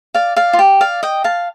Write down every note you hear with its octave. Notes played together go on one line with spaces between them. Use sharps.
D5 F5
D5 F5
F4
G4
D5 F5
D#5 G5
F5 A5